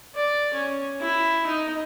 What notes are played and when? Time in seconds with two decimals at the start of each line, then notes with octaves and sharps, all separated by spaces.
0.15 D5
0.54 C#4
1.01 E4
1.46 D#4